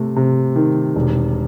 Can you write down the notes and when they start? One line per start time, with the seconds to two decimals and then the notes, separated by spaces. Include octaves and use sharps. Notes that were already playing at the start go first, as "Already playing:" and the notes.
Already playing: C3 A3
0.16 C3
0.56 D#3
0.96 E1